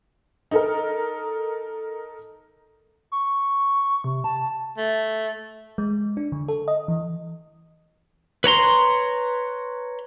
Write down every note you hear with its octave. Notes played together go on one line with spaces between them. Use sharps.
D#4 A4 A#4
C#6
C3
A5
A3
G#3
D4
D3
A4
D#5
E3
B4 C#5 A#5 C6